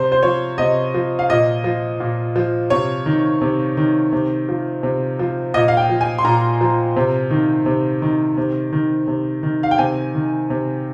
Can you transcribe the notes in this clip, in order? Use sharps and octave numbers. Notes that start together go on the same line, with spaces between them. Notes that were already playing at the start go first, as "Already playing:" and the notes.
Already playing: C3 C5
C5
F3 C#5
C3 D#5
F3
F5
A#2 D#5
F3
A#2
F3
C3 C#5
D#3
C3
D#3
C3
F3
C3
F3
A#2 D#5
F5
G5
F3
G#5
C6
A#2 A#5
F3
C3
D#3
C3
D#3
C3
D#3
C3
D#3
F5
G5
C3 G#5
D#3
C3